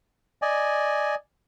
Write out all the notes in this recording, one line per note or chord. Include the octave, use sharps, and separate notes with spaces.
D5 D#5 G#5